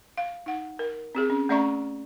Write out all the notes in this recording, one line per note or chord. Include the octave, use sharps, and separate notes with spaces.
F5
D#4 F#5
A#4
C4 G4 G#4
C#4
A3 C#4 D5 E5 A#5 C#6